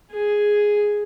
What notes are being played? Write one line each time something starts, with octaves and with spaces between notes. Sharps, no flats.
G#4